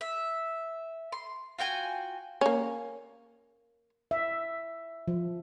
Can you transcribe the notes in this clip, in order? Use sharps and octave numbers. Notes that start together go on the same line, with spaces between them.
E5
C6
F4 F#4 G5 G#5
A#3 C#4
E5
F3